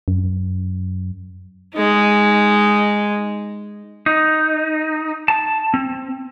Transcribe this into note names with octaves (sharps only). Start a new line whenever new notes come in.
F#2
G#3 D#4
D#4
A5
C4